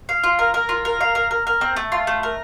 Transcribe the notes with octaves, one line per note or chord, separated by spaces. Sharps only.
F5
F4
A#4
A#4
F4
A#4
F5
A#4
A#4
A#4
C4
A3
F4
A3
A#4